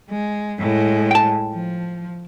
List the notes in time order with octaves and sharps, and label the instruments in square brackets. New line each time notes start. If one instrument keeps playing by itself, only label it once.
[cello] G#3
A2 G#3
[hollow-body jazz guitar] G5 A5
[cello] F3